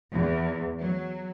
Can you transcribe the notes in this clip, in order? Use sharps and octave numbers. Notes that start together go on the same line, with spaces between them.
E2
F#3